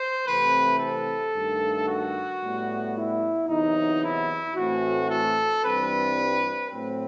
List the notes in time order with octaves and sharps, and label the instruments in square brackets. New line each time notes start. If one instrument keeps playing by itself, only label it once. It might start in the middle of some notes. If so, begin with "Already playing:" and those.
Already playing: [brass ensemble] C5
C3 E3 A3 C4 B4
A4
G2 D#3 A3
F#4
A2 G3 B3
E4
E2 C3 F#3 D#4
E4
A2 E3 A3 C4 F#4
A4
G2 E3 G3 C4 B4
A2 F#3 C4